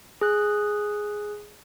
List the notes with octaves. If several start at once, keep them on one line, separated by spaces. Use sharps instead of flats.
G#4 F#6